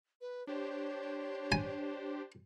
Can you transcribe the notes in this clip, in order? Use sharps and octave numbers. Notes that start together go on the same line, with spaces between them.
B4
D4 G4 C5 C#5
G#5